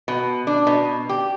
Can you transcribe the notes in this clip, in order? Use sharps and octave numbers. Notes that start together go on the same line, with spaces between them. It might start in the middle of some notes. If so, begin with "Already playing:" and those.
B2
D4
B2
G4